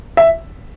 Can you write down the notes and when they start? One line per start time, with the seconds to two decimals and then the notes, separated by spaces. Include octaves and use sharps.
0.17 E5